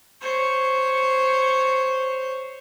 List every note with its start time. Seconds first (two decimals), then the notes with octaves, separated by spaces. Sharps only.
0.21 C5 C#5